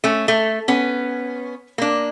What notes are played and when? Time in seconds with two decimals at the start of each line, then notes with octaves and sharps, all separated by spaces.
0.04 A3 C#4
0.28 A3
0.68 B3 C#4
1.78 A#3 D4